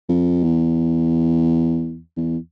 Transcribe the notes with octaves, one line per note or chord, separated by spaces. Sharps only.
F2
E2
E2